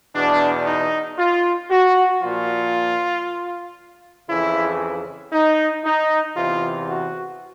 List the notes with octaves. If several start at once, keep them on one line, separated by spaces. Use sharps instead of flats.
E2 B2 D4
D#4
F4
F#4
A#2 F3 F4
F2 C#3 E3 E4
D#4
D#4
E2 C3 E3 F4
F#4